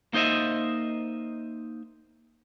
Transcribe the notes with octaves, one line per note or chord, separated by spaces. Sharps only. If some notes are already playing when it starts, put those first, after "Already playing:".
A#3 D#4 C5 D#5 E5